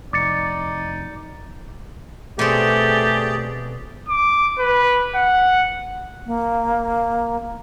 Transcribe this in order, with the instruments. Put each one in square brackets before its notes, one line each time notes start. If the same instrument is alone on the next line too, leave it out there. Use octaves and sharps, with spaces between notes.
[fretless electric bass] F1 [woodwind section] D#4 D5 [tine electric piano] D6 A6 C#7
[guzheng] B2 C4 [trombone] A3 [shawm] G4 [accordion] G#4 D5
[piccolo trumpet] D6
B4
F#5
[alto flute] A#3